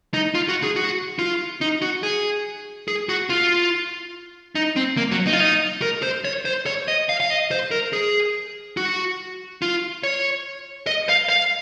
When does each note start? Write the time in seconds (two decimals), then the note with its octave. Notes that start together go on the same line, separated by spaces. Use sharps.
0.14 D#4
0.35 F4
0.49 F#4
0.63 G#4
0.76 F#4
1.19 F4
1.61 D#4
1.82 F#4
2.03 G#4
2.88 G#4
3.09 F#4
3.30 F4
4.55 D#4
4.76 C4
4.97 A#3
5.11 F#3
5.27 D#4
5.33 F4
5.40 D#4
5.82 A#4
6.03 C5
6.25 C#5
6.45 C5
6.66 C#5
6.88 D#5
7.09 F5
7.20 F5
7.30 D#5
7.51 C5
7.71 A#4
7.93 G#4
8.77 F#4
9.62 F4
10.03 C#5
10.87 D#5
11.09 F5
11.29 F5